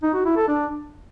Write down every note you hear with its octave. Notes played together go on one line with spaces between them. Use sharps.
D#4
F#4
E4
A4
D4